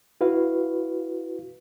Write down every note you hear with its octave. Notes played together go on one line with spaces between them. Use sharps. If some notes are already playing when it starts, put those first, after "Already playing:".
E4 F#4 B4 F5